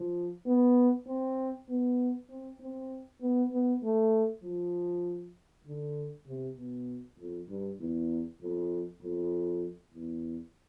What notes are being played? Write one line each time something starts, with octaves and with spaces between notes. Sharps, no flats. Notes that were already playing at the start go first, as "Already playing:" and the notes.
Already playing: F3
B3
C4
B3
C4
C4
B3
B3
A3
F3
D3
C3
B2
F2
G2
E2
F2
F2
E2